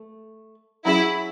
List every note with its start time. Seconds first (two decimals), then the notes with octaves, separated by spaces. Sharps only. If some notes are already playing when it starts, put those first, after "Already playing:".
Already playing: A3
0.85 F#3 C#4 E4 G#4